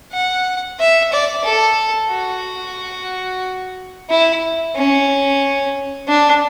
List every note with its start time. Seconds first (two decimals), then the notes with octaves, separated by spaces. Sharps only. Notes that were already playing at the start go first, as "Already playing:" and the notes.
0.12 F#5
0.79 E5
1.12 D5
1.44 A4
2.10 F#4
4.10 E4
4.75 C#4
6.08 D4